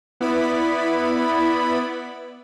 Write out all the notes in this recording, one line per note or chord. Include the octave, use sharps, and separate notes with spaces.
B3 E4 D5 B5